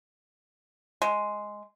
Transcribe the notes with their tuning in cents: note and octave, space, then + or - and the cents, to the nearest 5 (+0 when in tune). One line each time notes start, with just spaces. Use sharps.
G#3 +5